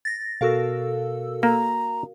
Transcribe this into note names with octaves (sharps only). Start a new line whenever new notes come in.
A6 A#6
B2 F#4 A4 A#4 F5 E6
A#3 A#5